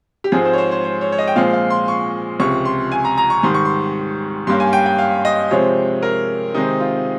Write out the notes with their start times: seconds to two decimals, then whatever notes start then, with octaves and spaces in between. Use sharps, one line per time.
0.24 G4
0.32 G#2 F3 G#3 C4 G#4
0.45 C5
0.53 C#5
0.58 C5
0.71 C5
0.84 C5
1.01 C#5
1.12 C#5
1.19 D#5
1.28 G5
1.36 A#2 F3 G#3 C4 F5
1.53 F5
1.70 C6
1.88 C#6
2.40 C#2 C3 F3 C#6
2.65 C6
2.92 G#5
3.05 A#5
3.18 A#5
3.30 C#6
3.43 G#2 D#3 G3 C6
3.54 C#6
3.65 C6
4.47 G2 G3 A#3 C#4 C6
4.60 G#5
4.73 G5
4.86 G5
4.98 F5
5.25 D#5
5.51 C3 F3 G#3 C4 C#5
6.03 A#4
6.54 C3 D#3 G#3 C4 D#4
6.80 F4